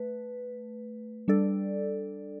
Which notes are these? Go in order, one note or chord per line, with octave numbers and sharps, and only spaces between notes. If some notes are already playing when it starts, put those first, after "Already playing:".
Already playing: A3 B4
G3 D4 A4 D5